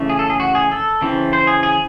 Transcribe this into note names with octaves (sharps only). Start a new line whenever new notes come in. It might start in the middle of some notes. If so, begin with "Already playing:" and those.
Already playing: C#3 E3 A3
G#4
A4
G#4
F#4
G#4
A4
C#3 E3 C4
C5
G#4
G#4